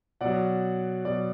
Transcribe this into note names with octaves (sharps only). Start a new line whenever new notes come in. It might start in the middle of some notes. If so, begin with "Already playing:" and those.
B2 F#3 D5 F#5
B2 F#3 D5